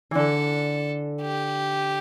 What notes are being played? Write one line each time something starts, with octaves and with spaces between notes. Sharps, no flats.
D3 E3 A4
G4